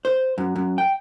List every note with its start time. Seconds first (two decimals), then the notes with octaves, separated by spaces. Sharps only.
0.05 C5
0.38 F#2
0.56 F#2
0.78 G5